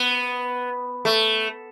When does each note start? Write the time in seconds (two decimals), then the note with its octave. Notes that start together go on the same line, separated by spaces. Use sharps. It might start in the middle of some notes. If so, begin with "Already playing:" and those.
Already playing: B3
1.05 A3